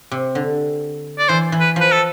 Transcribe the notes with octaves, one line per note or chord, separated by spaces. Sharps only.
C3
D3
D5
E3 C5
E3
B4
F3 B4
A4